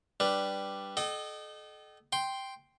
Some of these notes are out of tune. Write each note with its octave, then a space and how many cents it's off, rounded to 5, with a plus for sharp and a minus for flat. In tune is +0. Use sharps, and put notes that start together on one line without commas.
G3 +0 D4 +0 B4 +0
A4 -35 D#5 -30 G5 -35
G5 +0 C6 +0